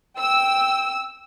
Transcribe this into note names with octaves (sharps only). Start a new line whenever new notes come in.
G5 E6